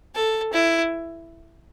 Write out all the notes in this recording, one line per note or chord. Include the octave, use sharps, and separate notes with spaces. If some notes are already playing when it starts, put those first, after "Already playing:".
A4
E4